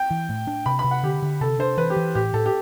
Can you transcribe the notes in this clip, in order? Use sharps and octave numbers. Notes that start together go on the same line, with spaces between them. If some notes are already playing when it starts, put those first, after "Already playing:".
Already playing: G5
E3
A2
D4
C3 B5
B5
C3
F#5
D3 G4
D3
C3 A4
D4 C5
E3 B4
G4
E3
A2 G4
A2 A4
G4